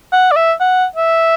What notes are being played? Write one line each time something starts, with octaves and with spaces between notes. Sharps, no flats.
F#5
D5
E5
F#5
E5